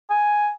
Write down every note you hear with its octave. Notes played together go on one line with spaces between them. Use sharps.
G#5